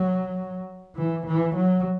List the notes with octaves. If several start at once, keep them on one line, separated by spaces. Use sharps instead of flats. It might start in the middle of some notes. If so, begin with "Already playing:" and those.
Already playing: F#3
E3
E3
F#3